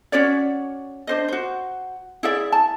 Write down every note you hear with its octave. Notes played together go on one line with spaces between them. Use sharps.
C#4 F#4 C#5 D5
D4 C5 D#5
F#4 C5
E4 G#4 D5 E5
A5